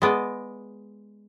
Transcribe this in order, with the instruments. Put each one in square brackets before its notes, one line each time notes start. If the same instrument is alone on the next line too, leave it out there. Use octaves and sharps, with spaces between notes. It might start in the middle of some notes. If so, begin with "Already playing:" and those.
[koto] G#3 B3 D5 D#5